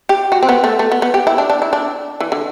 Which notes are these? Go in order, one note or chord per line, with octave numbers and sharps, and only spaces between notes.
G4
F#4
C4
B3
A3
A3
B3
B3
G4
E4
D4
D4
E4
D4
E3
D3